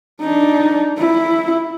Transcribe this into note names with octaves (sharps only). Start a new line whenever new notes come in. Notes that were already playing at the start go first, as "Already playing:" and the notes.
D4 D#4
E4